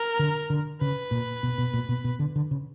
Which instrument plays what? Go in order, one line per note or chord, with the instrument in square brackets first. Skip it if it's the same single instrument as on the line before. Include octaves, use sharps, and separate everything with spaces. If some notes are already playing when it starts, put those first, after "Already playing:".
Already playing: [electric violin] A#4
[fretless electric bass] D3
D3
[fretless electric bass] C#3 [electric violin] B4
[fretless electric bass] A#2
B2
B2
A#2
B2
B2
D3
D3
C#3